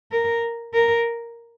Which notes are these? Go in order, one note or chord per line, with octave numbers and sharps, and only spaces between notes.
A#4
A#4